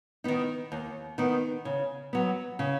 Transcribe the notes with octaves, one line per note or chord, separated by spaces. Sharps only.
D#3 B3 D#4
D#2
D#3 B3 D#4
C#3
F#3 B3
C#3